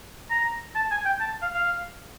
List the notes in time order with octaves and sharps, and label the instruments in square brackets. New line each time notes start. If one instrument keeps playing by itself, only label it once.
[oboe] A#5
A5
G#5
G5
A5
F5
F5